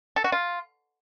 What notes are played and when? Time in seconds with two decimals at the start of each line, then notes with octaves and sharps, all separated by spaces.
0.16 A4
0.24 F#4
0.32 F4